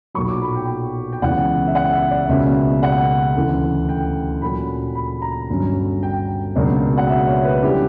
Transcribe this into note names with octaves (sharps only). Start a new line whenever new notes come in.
B1 A#2 F#3 C#6
D6
B5
G5
G5
C#2 C#3 E3 B3 F#5
E5
F#5
E5
D5
C#2 B2 A#3 C#4 E5
F#5
D2 C#3 E3
G5
A#2 F#3 C#4 B5
B5
A#5
G1 G2 F#3 C#4
G5
C#2 B2 F#3 A#3 D4
F#5
E5
C#5
B4
D3 G3 C#4 E4 G4